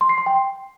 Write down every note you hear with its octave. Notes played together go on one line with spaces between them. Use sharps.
C6
C7
C6
G5